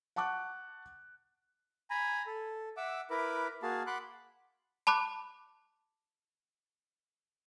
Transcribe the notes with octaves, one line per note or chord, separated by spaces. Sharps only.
F#5 A5 C#6 D6 F#6
G#5 A#5 B5
A4
E5 F#5 D6 E6
E4 A#4 B4 B5 D6
A#3 F#4 G#4 F5 A5
F#5 B5 C6 D6 F#6
A5 B5 D6 F#6